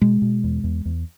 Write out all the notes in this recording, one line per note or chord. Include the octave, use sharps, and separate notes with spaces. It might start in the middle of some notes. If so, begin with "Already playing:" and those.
B2 G#3
B2
E2
E2
E2